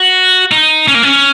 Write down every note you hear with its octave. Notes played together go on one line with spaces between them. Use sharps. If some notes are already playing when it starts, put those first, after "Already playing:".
Already playing: F#4
D#4
C#4
A#3
C#4